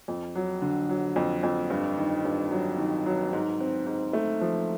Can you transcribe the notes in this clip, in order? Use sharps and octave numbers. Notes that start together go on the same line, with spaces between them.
F2
F#3
D3
F#3
F2
F2
G2
D#3
G2
F#3
D#3
F#3
G#2
C4
G#2
A3
F3